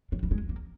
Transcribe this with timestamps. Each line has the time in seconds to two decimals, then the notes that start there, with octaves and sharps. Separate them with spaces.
0.12 G3
0.23 G3
0.31 G#3
0.49 A#3